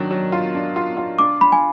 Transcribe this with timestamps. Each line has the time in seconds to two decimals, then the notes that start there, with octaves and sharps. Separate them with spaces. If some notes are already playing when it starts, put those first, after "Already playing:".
Already playing: D#3 F#3 D4
0.11 F#3
0.32 F4
0.55 D4
0.76 F4
0.97 F4
1.19 D4 D6
1.41 D4 B5
1.52 G#5